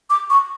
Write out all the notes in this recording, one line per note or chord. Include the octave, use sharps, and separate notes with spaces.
D6
C#6